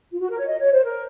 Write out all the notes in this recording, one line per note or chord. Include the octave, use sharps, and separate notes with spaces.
F4
F#4
A#4
C#5
D#5
C#5
C5
A#4